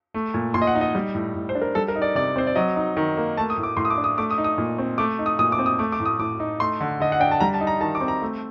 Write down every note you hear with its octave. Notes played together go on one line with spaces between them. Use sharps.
A3
A#2
A#2 C6
D#5
F#5
D#4
D#5
G3
A2
A2
C5
D4
A#4
G3 A4
A#4
D#4
D5
C3 D5
C4 C5
D5
F#3 D#5
D#4
D#3
A#3
A3 A5
D#6
A2
D6
A2 C6
D#6
D6
D4
D#6
A3 D6
D#6
D#4
D#6
A#2
C4
A3 D6
D#4
D#6
A#2 D#6
D6
C4
D#6
A3 D6
D6
A2
D#6
A2 D6
D#4
A3 C6
D3
D3 D#5
F#5
D4 G5
A5
G3 A#5
A5
D#4
A#5
D#3 A5
D6
C4
A#5
A3